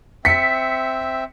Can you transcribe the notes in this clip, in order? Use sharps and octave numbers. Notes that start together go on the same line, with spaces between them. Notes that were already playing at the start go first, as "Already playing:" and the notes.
C4 E5 B6 C#7